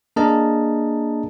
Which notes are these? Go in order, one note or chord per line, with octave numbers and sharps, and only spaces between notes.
A#3 D4 G#4 A#4 D#5 A5